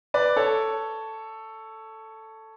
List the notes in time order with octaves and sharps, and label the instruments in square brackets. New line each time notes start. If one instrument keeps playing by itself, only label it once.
[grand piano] B4 D5
A4 C#5